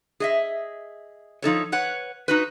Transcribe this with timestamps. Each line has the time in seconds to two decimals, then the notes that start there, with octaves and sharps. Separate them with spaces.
0.20 G#4 D#5 E5
1.42 F3 D#4 A4 C#5
1.72 B4 C#5 F#5
2.28 D#4 F#4 B4